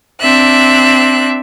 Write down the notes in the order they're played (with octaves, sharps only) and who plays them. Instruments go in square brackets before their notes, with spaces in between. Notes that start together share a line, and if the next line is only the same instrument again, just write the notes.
[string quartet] C4 D4 E5 F#6